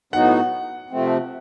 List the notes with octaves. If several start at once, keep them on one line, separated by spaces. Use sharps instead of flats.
A2 F#3 B3 D#4 F#4 F#5
C3 F3 A3 C4